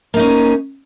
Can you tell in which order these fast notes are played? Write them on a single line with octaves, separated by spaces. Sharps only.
A#3 D#4 C#4